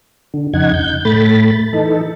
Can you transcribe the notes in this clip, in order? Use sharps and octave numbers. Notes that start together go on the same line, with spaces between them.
D3
F2 C#3 D#4 F#5 G#6
G6
A2 A3 B5 A6
E3 D#4 A4